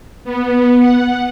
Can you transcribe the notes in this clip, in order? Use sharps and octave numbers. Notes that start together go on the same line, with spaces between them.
B3
F#5